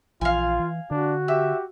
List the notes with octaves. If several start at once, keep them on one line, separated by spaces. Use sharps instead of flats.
A#1 E3 F4 F5 G#5
E3
D3 D4 F#4
G4 E5